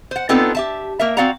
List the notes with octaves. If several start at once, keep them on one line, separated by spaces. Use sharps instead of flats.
C5 F#5
B3 C4 D4 D#4 F4 A4
G4 E5 A5
A#3 A#4 E5
C4 F#4 D5 F5 F#5 A#5